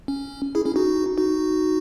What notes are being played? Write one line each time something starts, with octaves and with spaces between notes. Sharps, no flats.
C#4
E4 G#4
C#4 E4
D#4 F#4
D#4 F#4